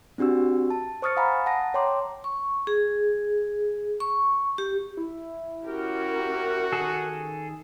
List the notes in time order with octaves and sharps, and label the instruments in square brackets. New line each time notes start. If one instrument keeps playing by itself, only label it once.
[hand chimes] C4 D4 F#4 G4 E6
A5
C5 C#6 D#6 F6 A6 C#7
F5 F#5 G#5 A#5 B5 D#6
F#5 A5 A#6
C#5 G5 A#5 C6 D6
[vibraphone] C#6
G#4
C#6
G4
[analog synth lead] E4
[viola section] C#4 G4 A#4 [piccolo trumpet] F#4
[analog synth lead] D#3 [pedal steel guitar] G#4 A4